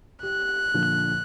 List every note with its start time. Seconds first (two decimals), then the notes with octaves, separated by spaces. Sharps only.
0.23 G4 F#6
0.74 A#2 D3 F3